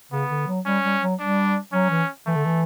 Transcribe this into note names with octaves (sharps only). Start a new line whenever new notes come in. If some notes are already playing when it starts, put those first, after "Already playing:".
C#3 B3
D3
F#3
G3 C#4
G3
F#3
G3 D4
F#3 C#4
E3
E3 A3
D3
E3